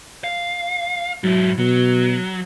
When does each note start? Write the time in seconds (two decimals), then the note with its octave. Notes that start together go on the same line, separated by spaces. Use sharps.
0.24 F5
1.23 G#2 F#3 E4
1.59 B2 F#3